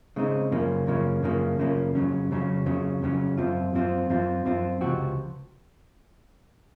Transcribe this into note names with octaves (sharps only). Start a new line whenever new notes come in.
C#3 G#3 C4 D#4
F#2 C#3 F3 A#3 C#4
F#2 C#3 F3 A#3 C#4
F#2 C#3 F3 A#3 C#4
F#2 C#3 F3 A#3 C#4
F2 C#3 F#3 C#4
F2 C#3 F#3 C#4
F2 C#3 F#3 C#4
F2 C#3 F#3 C#4
F#2 F3 C4 F4
F#2 F3 C4 F4
F#2 F3 C4 F4
F#2 F3 C4 F4
C#2 C3 F3 C4 F#4